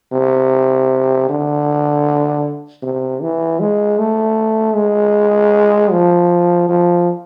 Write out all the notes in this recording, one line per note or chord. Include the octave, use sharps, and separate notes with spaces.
C3
D3
C3
E3
G#3
A3
G#3
F3
F3